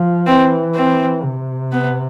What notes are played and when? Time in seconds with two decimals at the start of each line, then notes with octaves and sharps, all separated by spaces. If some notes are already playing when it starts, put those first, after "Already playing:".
Already playing: F3
0.27 E3 C4
0.75 C4
1.23 C3
1.72 B3